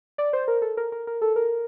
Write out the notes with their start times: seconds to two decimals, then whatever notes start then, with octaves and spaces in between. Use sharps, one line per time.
0.18 D5
0.33 C5
0.48 A#4
0.62 A4
0.77 A#4
0.92 A#4
1.07 A#4
1.22 A4
1.36 A#4